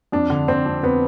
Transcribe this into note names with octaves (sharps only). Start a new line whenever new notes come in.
F2 D4
D3
D3 C4
F2
F2 B3